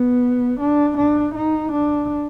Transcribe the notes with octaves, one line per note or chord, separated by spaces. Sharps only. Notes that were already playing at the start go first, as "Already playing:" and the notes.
Already playing: B3
D4
D4
D#4
D4